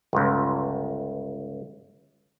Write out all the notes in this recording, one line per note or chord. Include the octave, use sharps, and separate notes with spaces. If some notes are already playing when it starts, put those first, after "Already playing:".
G1 C#2